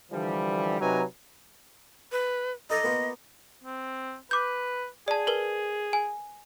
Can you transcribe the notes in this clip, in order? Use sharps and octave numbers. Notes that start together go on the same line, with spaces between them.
D3 E3 F3 G3
C3 F#3 D#4 B4 G#5 A#5
B4
D#4 A4 D5 D#5
A#3 B3 F4
C4
B4 D6 G6
G#4 D5 A5
A#4 B4 G7
G#5